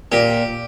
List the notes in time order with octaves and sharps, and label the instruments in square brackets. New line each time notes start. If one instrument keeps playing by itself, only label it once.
[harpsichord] A#2 G4